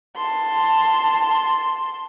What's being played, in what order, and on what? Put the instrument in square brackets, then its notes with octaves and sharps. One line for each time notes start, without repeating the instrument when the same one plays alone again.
[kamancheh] A5 C6